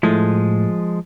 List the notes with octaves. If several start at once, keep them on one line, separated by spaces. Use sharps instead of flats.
A2 F3 G#3 A3